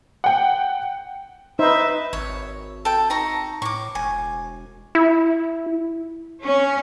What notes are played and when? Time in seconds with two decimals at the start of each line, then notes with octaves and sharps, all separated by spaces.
0.24 F#5 G5
1.59 D#4 B4 C5 E5
2.13 G#1 C#5
2.85 A4 G5
3.10 D#4 A#5 C#6
3.62 A2 C#6 D6
3.95 E1 G#5
4.95 E4
6.44 C#4